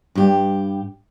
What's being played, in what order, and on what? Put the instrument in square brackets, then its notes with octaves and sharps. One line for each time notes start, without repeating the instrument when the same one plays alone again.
[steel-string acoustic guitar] G2 G4